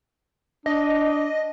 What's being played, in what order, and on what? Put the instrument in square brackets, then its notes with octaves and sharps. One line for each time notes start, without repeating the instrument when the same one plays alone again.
[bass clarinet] D4 [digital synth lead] D#5